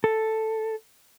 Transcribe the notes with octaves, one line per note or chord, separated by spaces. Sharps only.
A4